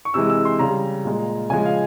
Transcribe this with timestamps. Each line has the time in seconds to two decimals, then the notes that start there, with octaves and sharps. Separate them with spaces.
0.05 C#6
0.14 C3 E3 G#3 E6
0.30 E6
0.45 C6
0.59 C#3 G3 A#5
1.05 A#2 G#3
1.50 C#3 F3 G#3 G#5
1.65 F5